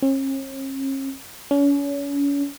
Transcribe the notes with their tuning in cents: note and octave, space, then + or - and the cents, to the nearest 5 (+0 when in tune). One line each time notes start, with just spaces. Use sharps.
C#4 -45
C#4 +35